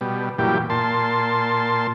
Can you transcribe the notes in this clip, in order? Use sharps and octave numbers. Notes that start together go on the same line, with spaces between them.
B2 G3
F#2 A#2 E3 G3 G4
A#2 A5 C6